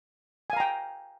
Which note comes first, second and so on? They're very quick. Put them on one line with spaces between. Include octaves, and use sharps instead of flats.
G#5 F5 A#5 G5